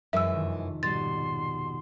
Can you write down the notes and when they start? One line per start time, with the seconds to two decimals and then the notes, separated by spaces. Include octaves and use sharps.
0.13 F#2 E3 G#3 E5 E6
0.31 F2 C3 D#3
0.83 F1 G#2 B2 G3 C6 A6